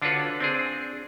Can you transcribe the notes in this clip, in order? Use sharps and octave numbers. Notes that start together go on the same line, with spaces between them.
D3 D4 F4 F#4 B4 C#5
C4 D4 G#4